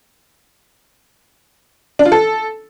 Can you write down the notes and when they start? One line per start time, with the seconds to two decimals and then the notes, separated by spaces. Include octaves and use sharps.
1.99 D4
2.05 F4
2.12 A4